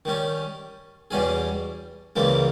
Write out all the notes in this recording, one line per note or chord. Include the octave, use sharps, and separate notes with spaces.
D#3 G3 C#4
E2 B2 G3 C#4 G#4
C#2 C#3 E3 G3 A#3